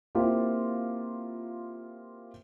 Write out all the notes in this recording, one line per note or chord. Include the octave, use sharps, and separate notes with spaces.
A#3 C4 E4 F4 G4